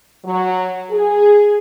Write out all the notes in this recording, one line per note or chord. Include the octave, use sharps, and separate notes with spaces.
F#3
G#4